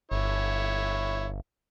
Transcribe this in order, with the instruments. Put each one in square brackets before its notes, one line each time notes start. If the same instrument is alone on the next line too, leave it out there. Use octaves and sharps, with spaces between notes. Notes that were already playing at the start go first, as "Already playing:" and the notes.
[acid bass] G1 [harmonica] E4 C#5